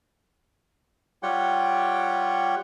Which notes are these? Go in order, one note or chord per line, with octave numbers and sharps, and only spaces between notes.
G3 F4 G4 C#5 F#5 G5